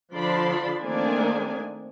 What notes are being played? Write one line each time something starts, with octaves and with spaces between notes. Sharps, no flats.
D3 F3 D5 A5 B5 C6
D#3 A3 A#3 C4 D4 G#5